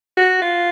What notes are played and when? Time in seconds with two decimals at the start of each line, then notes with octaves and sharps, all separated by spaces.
0.17 F#4
0.42 F4